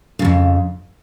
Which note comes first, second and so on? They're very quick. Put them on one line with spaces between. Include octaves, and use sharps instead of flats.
C#3 A#2 F2